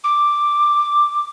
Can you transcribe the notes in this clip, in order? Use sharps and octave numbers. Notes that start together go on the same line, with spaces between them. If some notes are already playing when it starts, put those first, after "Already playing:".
D6